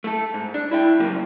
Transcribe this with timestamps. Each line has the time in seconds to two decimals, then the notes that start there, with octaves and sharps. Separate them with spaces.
0.04 A3 A4
0.34 G#2
0.54 D4
0.71 E4 E5 G5
1.00 G#2 C#3 F3 F#3 A#3